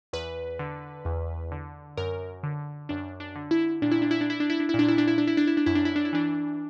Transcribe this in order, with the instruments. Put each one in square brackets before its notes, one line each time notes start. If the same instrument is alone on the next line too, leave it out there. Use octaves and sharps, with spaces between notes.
[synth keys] E2 B4
D3
E2
D3
F#2 A#4
D3
F#2 D4
D4
D3
E4
A#2 D4
E4
D4
E4
D4
E4
D4
E4
D4
E4
A#2
D4
E4
D4
E4
D4
E4
D4
E4
D4
F#2 E4
D4
E4
D4
E4
E3 D4